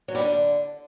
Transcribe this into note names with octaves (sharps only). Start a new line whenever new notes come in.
F#3
G3
D3